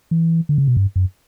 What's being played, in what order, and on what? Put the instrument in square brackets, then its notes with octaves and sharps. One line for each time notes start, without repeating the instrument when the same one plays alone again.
[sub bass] E3
D3
C#3
B2
G2
F#2